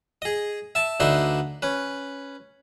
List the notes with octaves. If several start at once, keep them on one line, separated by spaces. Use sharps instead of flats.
G#4 D#5
E5 A5
D2 D3 D#4 B4 E5 C6
C#4 B4